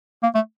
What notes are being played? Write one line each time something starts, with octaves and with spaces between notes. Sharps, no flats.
A#3
A3